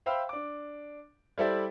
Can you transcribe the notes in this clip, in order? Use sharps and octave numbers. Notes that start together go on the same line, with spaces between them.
C5 E5 F5 G5 B5 E6
D4 D6
G3 E4 A4 C5 D5 E5